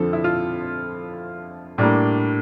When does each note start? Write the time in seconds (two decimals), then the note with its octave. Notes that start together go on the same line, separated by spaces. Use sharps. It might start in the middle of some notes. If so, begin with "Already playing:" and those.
Already playing: F2 D3 F3 A4
0.13 E4
0.24 F4
1.78 A2 G3 A#3 D4